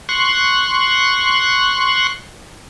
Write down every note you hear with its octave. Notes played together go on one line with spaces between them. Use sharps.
C6 C#6 F#6